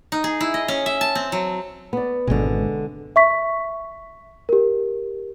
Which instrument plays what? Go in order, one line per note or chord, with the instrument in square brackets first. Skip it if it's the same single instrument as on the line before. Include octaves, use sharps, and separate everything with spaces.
[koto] D#4
G#4
E4
D#5
C#4
E5
A5
C4
F#3
[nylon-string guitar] B3 D5
[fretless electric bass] G#1 B2 [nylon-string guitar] D3 G#3
[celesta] E5 C#6 B6
G4 A#4